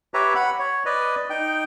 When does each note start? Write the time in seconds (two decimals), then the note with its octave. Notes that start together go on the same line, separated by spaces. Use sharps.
0.14 G4 B4 C#5 E5 A#5
0.35 F#5 B5
0.59 C#5
0.86 B4 D5 D#5
1.30 D#4 G5